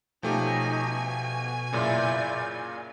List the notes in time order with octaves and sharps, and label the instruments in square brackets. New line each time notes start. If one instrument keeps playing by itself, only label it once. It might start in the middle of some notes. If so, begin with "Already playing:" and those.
[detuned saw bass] B2 [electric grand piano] F3 A3 G4 [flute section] C#4 D#4 [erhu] G#5
[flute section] F#4
[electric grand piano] F#2 A#2 C#3 [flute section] E4 D5 G6